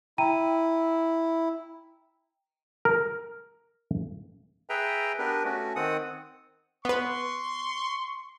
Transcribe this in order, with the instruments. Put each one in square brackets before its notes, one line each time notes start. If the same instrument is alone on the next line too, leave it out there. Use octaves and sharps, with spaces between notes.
[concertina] E4 [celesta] G5 A#5 D#7
[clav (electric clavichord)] A#4
[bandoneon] G#4 B4 E5 G5 A#5
B3 D4 G4 A#4 B4
A3 C#4 F#4
D#3 C4 F#5 D#6
[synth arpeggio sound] B3 B4 [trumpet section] C6 C#6